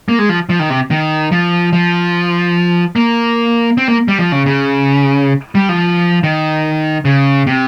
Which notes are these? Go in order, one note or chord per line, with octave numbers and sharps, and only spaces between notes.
A#3
G#3
F3
F3
D#3
C3
D#3
F3
F3
A#3
C4
A#3
G3
F3
C#3
C#3
G3
F3
D#3
C#3
C3